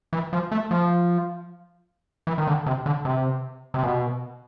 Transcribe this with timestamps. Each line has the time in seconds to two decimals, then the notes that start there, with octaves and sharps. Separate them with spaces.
0.13 E3
0.33 F3
0.52 A3
0.71 F3
2.27 E3
2.38 D#3
2.47 D3
2.66 C3
2.86 D3
3.05 C3
3.74 C3
3.83 B2